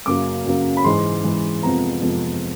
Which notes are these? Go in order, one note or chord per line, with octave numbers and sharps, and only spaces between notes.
F#2 C#3 F#3 A#3 D6
F#2 C#3 F#3 A#3
B5
G#2 E3 G#3 C6
G#2 E3 G#3
F2 C3 F3 G#3 B3 A#5
F2 C3 F3 G#3 B3